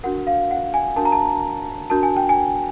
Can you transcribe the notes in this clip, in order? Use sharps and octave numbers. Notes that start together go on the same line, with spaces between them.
D4 F#4 A#4 F#5
F5
F#5
G#5
D4 F#4 A#4 A5
A#5
A5
D4 F#4 A#4 A5
G#5
G5
G#5